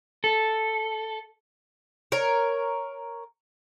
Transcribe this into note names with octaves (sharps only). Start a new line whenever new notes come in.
A4
A#4 C#5